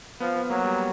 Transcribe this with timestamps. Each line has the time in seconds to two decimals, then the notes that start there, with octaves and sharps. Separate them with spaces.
0.20 F3 B3
0.35 B3
0.50 F#3 A#3
0.64 G3